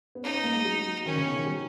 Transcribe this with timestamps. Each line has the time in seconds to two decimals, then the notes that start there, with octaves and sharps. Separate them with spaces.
0.15 B3
0.23 C#4 D#4
0.34 B3
0.44 A#3
0.54 G#3
0.65 F#3
1.06 D#3 C#4
1.16 C#3
1.26 B2
1.36 D#3
1.46 F#3